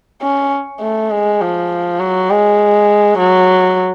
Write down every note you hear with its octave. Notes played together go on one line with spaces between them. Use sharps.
C#4
A3
G#3
F3
F#3
G#3
F#3